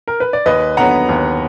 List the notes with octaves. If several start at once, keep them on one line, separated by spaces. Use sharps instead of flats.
A#4
B4
D5
D#2 B4 D#5
D3 F#3 B3 F#5 A#5
D#2